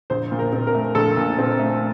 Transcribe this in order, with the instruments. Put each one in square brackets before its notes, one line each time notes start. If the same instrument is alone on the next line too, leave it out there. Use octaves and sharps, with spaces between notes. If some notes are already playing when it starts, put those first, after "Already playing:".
[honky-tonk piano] A#1 C5
A#2
A#4
C4
A#4
A3
A#1 A4
A#2
C4
A3